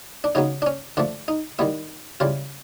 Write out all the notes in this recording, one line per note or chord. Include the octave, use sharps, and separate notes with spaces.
D4
C#3 F#3 B3 D#4
D4
C#4
D3 F3 A3 D4
D#4
D#3 G3 B3 E4
C#3 E3 G3 F4